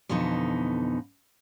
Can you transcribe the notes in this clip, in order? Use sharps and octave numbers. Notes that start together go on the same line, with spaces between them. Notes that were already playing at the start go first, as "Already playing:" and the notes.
F2 B2 D3 E3 B3 D#4